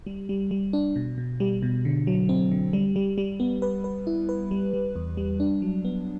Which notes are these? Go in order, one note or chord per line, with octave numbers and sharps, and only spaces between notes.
G3
G3
G3
D4
B2
B2
G3
B2
D3
F#3
C4
D3
G3
G3
G3
B3
B4
B4
E4
B4
G3
G3
E2
G3
D4
F#3
B3